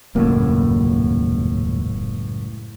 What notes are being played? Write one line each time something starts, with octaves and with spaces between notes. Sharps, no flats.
D#1 C#2 F#2 A2 A#3